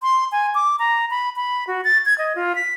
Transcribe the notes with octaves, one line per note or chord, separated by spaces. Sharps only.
C6
G#5
D6
A#5
B5
B5
F#4
A6
G#6
D#5
F4
B6